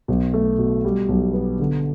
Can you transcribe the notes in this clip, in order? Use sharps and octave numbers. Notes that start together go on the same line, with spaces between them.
B1
A3
B2
G3
B1
B3
D3